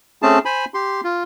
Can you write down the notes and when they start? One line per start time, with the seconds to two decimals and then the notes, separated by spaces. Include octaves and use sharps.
0.22 A3 C4 C#4 G#4 A5
0.45 C5 G#5 B5
0.74 G4 C6
1.04 F4